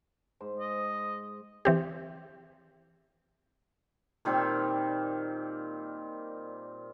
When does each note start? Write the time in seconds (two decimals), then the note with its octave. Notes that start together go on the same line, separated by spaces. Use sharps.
0.40 G#2 C5
0.59 D#5
1.65 E3 C4 G4
4.25 A#2 D#3 G3 C4